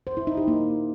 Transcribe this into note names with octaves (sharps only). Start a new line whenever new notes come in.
C5
E4
D#4
G4
A#3